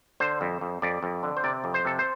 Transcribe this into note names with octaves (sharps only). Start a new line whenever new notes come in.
D3 C5
F2
F2
F2 D5
F2
D3
C5
C3 D5
F2
C5
C3 A4
C5